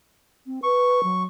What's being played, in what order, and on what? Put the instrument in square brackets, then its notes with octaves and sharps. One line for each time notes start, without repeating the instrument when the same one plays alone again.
[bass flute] C4
[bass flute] B4 [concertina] C#6
[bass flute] F#3